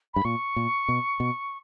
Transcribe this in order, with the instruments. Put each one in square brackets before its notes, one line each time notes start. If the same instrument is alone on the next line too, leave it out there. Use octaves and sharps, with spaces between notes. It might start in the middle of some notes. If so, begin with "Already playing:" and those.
[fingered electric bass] G2 [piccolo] B5
[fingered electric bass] A#2 [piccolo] C#6
[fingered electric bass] A#2
B2
B2